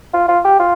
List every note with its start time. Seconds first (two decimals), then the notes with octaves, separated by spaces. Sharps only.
0.14 F4
0.28 F4
0.45 G4
0.60 F4